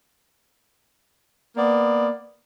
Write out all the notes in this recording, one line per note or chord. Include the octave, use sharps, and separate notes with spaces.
A#3 B3 D5